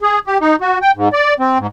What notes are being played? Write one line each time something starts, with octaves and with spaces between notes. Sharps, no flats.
G#4
G4
D#4
F#4
G5
G#2
D5
C4
G#2